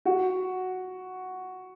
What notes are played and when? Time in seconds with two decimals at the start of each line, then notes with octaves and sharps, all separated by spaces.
0.05 F#4